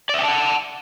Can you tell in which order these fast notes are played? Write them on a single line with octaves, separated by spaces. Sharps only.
D5 E5 G5 A5 F#5